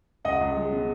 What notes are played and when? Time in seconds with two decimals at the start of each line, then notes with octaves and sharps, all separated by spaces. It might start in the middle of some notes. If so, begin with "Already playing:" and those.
0.25 C#2 D#5 F#5
0.41 C#2
0.57 G#3
0.72 B2